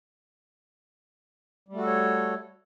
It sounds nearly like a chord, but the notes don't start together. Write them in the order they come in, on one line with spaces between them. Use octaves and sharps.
G3 A3 F#4 A4 C#5